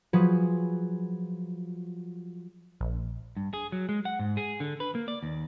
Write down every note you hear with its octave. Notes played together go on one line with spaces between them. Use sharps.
F3 F#3 G#4 B4
A#1
G2
G#4
F#3
G#3
F#5
G#2
G#4
D3
B4
A#3
D5
D#2